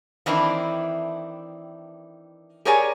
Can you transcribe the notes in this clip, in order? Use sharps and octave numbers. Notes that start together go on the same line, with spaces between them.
D#3 E3 C4 D4 E4
G4 G#4 A#4 C#5 D5 G#5